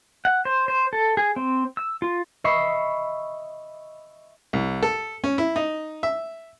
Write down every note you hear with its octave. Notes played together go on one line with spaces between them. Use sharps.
F#5
C5
C5
A4
G#4
C4
E6
F4
D#5 E5 B5 C#6 C7
C2
A4
C#4
E4
D#4
E5